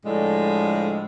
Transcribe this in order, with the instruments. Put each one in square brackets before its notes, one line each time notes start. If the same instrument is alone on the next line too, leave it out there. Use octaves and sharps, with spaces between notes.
[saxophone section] A2 D3 F3 G#3